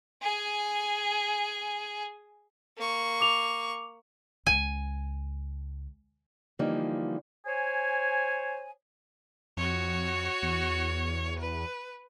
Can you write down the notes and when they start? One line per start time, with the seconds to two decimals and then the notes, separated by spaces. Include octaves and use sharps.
0.22 G#4 G#5
2.77 A#3 C#6
3.21 D6 F7
4.47 C#2 G#5
6.59 D3 E3 F3 G3 A#3 D#4
7.46 C5 C#5 G#5
9.57 F2 F#4 C#5
10.42 E2
11.39 B4